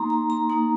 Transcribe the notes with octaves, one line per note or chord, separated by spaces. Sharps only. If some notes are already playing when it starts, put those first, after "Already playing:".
Already playing: A#3 D#4 A#5 C6
A#5
A#5
A#3 D#4 A#5